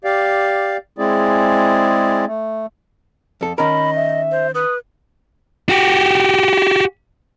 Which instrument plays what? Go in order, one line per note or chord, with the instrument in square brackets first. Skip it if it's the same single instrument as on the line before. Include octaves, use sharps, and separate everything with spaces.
[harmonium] G4 D5 F5
G#3 C4 E4 G#4 D5
A3
[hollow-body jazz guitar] F2 A4
[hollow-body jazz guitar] D#3 C#4 A#4 [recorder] D#5 [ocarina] B5
[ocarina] E5
[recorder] C5
[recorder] B4 [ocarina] D#6
[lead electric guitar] F#4 G4